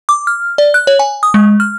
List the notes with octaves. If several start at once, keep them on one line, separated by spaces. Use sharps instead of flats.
D6
F6
D5
F#6
C#5
G#5
D#6
G#3
F6